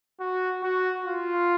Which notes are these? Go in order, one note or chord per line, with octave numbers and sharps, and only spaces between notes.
F#4
F#4
F4